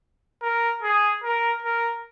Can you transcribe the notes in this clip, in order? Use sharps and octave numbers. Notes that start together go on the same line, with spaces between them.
A#4
G#4
A#4
A#4